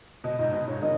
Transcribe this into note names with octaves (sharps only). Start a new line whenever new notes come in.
B2 D#5
G#2 D#5
B2 D#5
G#2 C#3 C#5
B2 D#3 D#5